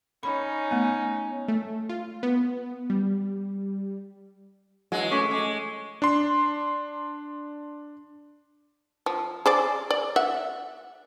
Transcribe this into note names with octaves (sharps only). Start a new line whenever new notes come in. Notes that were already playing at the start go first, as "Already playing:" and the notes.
C#4 D#4 B5
A3 B3
A3
F4
B3
G3
E3 F#3 G#3 F#4
A3 C#4 A4 C#6 D6 B6
G#3
D4 C6
F3
G#4 C5 D5
D5
E5 F#5